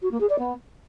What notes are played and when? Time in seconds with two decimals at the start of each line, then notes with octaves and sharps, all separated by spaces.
0.02 F#4
0.11 A#3
0.20 G#4
0.29 D5
0.38 B3